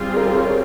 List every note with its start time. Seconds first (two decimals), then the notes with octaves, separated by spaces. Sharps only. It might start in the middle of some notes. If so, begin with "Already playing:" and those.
Already playing: G3 C4 F4 G#4
0.16 A#4
0.26 C5
0.36 C#5
0.46 A#4